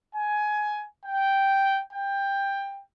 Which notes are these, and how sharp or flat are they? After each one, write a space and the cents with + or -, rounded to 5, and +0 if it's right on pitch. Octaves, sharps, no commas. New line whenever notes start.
G#5 +15
G5 -5
G5 +15